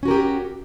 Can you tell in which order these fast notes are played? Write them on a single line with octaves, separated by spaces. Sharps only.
C#4 F#4 A#4 G4